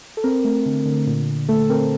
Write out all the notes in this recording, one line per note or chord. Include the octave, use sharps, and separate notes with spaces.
A4
C4 A#4
A3
D3
D3
A#2
A#2
A3 A4
C4 A#4